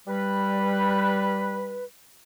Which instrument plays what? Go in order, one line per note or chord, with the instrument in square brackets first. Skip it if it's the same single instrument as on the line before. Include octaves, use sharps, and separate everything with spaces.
[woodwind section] G3 B4